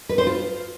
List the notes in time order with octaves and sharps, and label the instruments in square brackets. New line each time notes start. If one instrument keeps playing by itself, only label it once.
[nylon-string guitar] B4
C5
F4